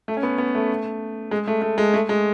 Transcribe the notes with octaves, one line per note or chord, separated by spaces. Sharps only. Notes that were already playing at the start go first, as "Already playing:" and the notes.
A3
C#4
B3
B3
A3
G#3
A3
A3
G#3
A3
G#3